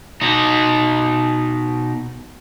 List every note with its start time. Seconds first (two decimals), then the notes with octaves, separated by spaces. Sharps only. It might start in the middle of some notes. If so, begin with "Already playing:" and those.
0.21 B2 D#4